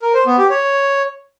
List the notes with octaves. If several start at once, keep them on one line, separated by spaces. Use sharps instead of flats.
A#4
C5
B3
G4
C#5